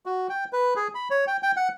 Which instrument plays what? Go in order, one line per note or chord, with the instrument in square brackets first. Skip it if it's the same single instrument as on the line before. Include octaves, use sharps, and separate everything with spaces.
[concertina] F#4
G5
B4
G#4
B5
C#5
G5
G5
F#5